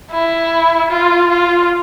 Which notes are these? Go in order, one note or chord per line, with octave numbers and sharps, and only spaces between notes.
E4
F4
F4